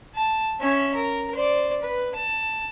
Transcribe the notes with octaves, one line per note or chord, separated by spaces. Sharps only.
A5
C#4 E5
A#4
C5 D5
B4
A5